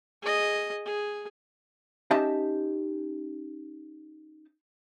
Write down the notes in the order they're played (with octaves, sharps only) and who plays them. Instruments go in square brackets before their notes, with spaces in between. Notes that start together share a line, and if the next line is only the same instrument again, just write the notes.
[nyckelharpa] G#4 D#5
G#4
[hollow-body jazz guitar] C#4 D#4 G4 D#5 E5 A5